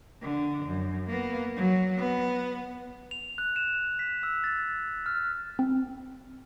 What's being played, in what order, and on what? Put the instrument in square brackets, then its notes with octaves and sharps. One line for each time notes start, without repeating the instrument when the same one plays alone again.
[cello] D3
F#2
A#3 B3
F#3
B3
[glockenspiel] F7
F#6
E7
B6
E6
A6
F6
[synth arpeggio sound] C4